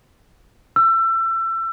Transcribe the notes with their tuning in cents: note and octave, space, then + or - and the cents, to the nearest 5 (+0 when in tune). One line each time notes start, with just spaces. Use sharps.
E6 +30